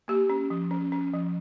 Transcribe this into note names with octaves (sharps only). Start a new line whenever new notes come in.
A#3 G4
C#4
F3
C#4
C#4
F3